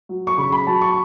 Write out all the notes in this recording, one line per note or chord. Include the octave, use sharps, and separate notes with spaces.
F#3
C#6
C#3 B5
B5
F#3 A5
C#6